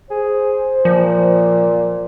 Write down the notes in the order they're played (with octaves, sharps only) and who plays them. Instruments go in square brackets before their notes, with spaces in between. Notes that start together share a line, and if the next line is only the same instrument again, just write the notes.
[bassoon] G#4 [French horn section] C5
[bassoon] A#2 [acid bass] F3